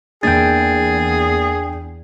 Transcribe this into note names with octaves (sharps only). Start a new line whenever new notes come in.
E2 A#3 D4 G#4 G5 A6